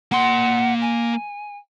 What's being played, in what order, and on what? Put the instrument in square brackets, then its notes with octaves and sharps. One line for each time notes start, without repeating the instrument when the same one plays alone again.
[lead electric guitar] A#3 C6 [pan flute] F#5
[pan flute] G#5